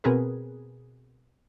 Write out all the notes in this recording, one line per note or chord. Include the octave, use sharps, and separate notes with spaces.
B2 C4 G#4 A#4 B4